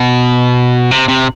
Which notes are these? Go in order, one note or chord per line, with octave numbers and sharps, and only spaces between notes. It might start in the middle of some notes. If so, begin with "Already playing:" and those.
Already playing: B2
C3
C3